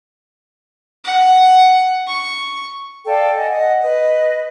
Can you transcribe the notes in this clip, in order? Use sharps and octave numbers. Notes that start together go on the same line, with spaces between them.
F#5
C#6
A4 D5 F5 G5
D#5 F#5 G#5
D#5 F#5
B4 D#5